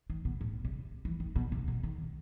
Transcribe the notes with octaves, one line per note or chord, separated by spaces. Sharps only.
D#3
B2
A2
C3
E3
D#3
B2
C3
B2
D#3